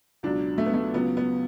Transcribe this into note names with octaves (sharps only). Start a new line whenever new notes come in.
C#2 B2 F#3 D4
A3
B3
A3
C#2 C#3 F#3 B3
B3